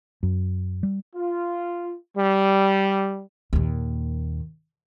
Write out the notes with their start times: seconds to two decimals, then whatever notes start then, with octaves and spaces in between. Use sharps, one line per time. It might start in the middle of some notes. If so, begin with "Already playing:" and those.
0.23 F#2
0.83 G3
1.15 F4
2.16 G3
3.53 D#2 A#2